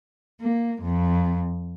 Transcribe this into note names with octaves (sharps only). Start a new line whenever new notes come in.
A#3
F2